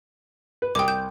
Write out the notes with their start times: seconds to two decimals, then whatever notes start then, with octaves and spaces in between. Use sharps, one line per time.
0.62 B4
0.75 C2 G5 D6 D#6
0.88 G6